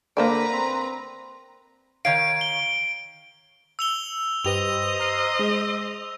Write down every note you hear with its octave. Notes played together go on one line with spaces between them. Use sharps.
D3 A#3 B4 C5 D5 A#5
C4
D#3 C#5 F5 D7
G7
E6 F7 G7
G2 G4 B4 C5 D#5 F7
A#5 F6 C7
G#3 G#4